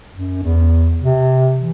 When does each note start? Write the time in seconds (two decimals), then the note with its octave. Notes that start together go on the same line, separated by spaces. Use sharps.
0.14 F#2
0.43 E2
1.00 C3
1.58 E3